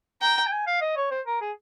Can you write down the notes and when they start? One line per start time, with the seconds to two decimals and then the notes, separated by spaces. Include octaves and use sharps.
0.22 G5 A#5
0.37 A#5
0.47 G5
0.52 G#5
0.67 F5
0.81 D#5
0.97 C#5
1.11 C5
1.26 A#4
1.41 G#4